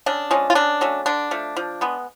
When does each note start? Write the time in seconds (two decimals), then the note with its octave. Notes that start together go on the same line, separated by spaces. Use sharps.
0.06 C#3 D4
0.31 F3 G#3 C#4
0.50 F4
0.55 C#3 D4
0.81 F#3 A3 C#4
1.06 D3 D4
1.31 F3 A3
1.56 F3
1.81 G#3 B3